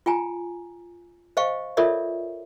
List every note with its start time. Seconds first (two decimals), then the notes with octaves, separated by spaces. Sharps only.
0.06 F4 G5 G#5 A#5
1.37 C5 D#5 F5 G5 C#6
1.77 F4 A4 A#4 C#5 D5 E5